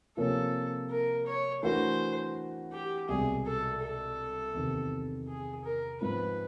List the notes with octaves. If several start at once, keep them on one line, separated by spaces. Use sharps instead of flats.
C3 F3 A#3 C#4 A4
A#4
C#5
E3 A3 D4 F#4 A#4 C5
G4
C2 B2 G#3 G#4
A4
A4
E2 C3 D#3
G#4
A#4
G#2 F3 G#3 C4 B4